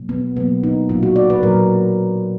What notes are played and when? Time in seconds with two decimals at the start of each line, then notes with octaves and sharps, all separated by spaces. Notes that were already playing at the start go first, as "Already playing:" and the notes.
Already playing: B2 F#3 A#3
0.09 B3
0.37 B2 F#3 A#3 B3
0.63 D#4
0.89 A#2 F#3 A#3 F4
1.03 F#4
1.16 D5
1.30 B4
1.43 A#2 F#3 A#3 A#4